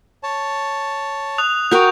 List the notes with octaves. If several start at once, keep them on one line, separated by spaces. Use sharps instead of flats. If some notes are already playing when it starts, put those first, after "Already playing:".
C#5 A5
D#6 F#6 F7
F#4 A#4 G5 C#6 D#6 G6